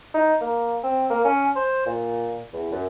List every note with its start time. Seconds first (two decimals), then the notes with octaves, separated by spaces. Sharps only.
0.14 D#4
0.41 A#3
0.84 C4
1.10 A#3
1.25 C#4
1.56 C5
1.86 A#2
2.53 E2
2.72 F#2